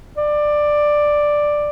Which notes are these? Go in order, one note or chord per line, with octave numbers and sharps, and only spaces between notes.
D5